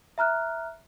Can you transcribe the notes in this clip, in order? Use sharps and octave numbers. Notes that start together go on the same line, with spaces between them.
E5 A#5 F6 F#6